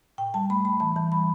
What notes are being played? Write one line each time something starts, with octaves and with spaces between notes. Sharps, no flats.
A2 G5
G3 A5
A3 B5
A3 B5
E3 A5
E3 A5
G3 B5